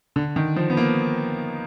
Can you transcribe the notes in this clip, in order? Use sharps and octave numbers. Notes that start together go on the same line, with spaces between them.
D3
D#3
F3
B3
A#3